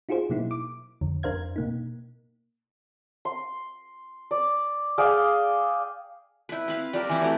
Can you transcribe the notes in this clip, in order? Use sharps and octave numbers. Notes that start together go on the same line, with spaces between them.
D#4 F4 F#4 G#4 C5
B2 F#3 A#3 D#4 E4
D6
F2 D3
F2 D4 A#4 C5 F5 G#6
B2 A#3 D#4
C6
D5
G#4 D5 F5 G5
E4 B4
C4 B4 F5
G3 G4 A#4 F5
E3 C4
A3 F#4 G4